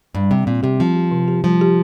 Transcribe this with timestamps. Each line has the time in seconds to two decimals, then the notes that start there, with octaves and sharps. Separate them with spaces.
0.15 G2 G3
0.31 C3 G3
0.47 A#2 C4
0.63 C3 G4
0.79 F3 C4
0.96 G4
1.11 C3
1.28 G4
1.44 F3 G3
1.61 G4